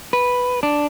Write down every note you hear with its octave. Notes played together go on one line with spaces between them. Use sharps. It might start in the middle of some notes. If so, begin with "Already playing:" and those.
B4
D4